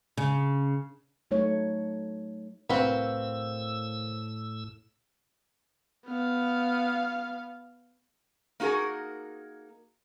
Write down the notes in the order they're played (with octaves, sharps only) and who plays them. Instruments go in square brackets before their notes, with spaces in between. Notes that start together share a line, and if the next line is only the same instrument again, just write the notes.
[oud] C#3
[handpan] F#3 A3 D#4 C#5
[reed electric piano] C2 A#4 F5 [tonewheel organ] A2 E6 [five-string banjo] C4 F#4 B4
[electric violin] B3 F5
[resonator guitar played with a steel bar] A#3 D#4 F#4 G#4 A#4